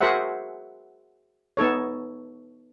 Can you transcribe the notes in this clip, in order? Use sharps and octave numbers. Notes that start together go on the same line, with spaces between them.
F#4 G#4 A#4 C5 E5 F#5
B3 D#4 A4 C#5